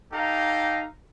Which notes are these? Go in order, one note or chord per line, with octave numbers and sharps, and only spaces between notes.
D#4 G4 A4 F5 A#5